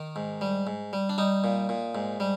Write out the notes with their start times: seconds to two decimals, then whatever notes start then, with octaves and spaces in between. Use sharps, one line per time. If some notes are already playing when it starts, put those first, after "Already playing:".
Already playing: D#3
0.16 G#2
0.41 G3
0.67 G#2
0.93 G3
1.09 D4
1.18 G3 D#4
1.44 A#2
1.69 A#2
1.95 G#2
2.20 G3